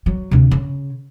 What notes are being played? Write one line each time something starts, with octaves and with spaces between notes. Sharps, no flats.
F#3
D2 C3
C#3